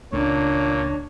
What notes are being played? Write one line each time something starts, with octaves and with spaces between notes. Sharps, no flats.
C#2 A#2 C#3 A3 D4 C#5